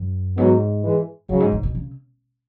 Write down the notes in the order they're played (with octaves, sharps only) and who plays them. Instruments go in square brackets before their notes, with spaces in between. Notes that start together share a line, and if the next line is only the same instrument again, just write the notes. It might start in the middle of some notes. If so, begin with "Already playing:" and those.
Already playing: [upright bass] F#2
[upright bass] G#2 [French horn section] F#3 B3
[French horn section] E3 G#3
[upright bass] F#2 [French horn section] C#3 F#3
[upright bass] G#2
B2
B2
C#3